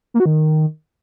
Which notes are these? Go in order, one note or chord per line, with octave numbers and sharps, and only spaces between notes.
A#3
F#4
D#3